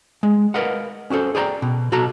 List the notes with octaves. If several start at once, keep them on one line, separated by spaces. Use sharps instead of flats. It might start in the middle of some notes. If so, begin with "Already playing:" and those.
G#3
A#4 B4 D#5 F5 F#5
C#4 F#4 G4 A4 C5
G#4 D5 G5 A5 A#5
B2
B2 F#4 A4 A#5